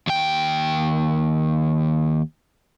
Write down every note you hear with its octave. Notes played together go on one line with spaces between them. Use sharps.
D#2 G5